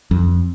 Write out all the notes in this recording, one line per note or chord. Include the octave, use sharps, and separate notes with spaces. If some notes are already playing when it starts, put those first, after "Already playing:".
F2